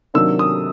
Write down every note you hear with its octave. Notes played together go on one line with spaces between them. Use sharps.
C3 D#3 F#3 A#3 D4 E6
D#6